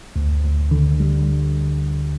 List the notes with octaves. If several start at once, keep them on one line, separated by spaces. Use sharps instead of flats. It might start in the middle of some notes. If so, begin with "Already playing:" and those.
D2
D2
D3
G3